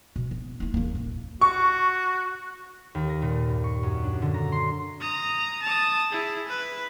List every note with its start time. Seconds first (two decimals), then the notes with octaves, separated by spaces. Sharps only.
0.16 B2
0.31 B3
0.60 A#3 E4
0.74 E2 A#3
0.95 A#1
1.41 F#4 C#6
2.95 D#2
3.09 A#6
3.22 A#2
3.48 G2
3.64 C#6
3.83 F#2
4.04 D4
4.22 D3
4.34 A#5
4.52 C6
5.01 A#5 D#6
5.63 A5 D#6
6.11 E4 G#4
6.48 B4